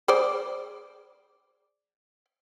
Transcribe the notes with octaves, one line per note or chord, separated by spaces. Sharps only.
G#4 C5 D5